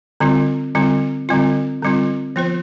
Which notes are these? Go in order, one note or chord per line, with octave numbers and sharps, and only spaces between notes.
D3 G3 C4 F4
D3 G3 C4 F4
D3 G3 C4 F4
D3 G3 C4 F4
F3 B3 F4 C5